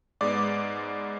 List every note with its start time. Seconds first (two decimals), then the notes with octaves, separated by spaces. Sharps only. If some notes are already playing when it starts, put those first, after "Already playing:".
0.21 G#2 G#3 B3 D5 D6